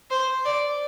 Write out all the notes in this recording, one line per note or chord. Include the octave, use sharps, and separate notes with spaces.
C5
D5